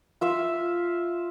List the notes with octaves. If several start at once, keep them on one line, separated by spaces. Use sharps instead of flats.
F4 E5 F5